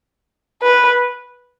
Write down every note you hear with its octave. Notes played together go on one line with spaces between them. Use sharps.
B4